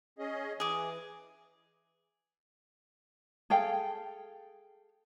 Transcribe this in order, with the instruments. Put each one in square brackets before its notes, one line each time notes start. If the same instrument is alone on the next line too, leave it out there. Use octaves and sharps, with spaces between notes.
[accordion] C#4 G#4 D#5
[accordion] E3 [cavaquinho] G#4 D6
[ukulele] G#4 A4 F5 G5